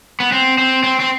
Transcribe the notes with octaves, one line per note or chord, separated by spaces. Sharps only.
B3
C4
C4
C4
C4